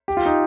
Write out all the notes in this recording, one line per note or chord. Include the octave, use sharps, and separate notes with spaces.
G4
F4
D#4